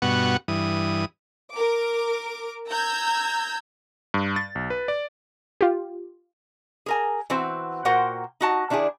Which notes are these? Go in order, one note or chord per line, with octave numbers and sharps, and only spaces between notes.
G2 B2 B3 F#4 F#5 C#6
G2 E3 D#6
A#4 D6
A#5 E6 G6 G#6
G2
A6
B1
B4
D5
F4 G4
G#4 A#4 G#5
E3 C4 F#4 C5
A#2 F#4 A#4 C5 F#5 G5
D#4 F#4 A5
D#3 D4 E4 G4 G#4